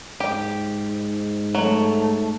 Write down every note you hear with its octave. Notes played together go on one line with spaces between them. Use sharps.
G#2 G4
F#3 A3